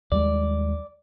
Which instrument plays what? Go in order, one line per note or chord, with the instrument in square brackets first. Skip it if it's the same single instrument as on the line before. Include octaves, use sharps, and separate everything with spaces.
[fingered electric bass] D#2 G3 G#3 [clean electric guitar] D5